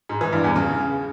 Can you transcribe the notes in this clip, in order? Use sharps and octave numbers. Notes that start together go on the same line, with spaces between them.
G#2
E3
G2
E2
C#3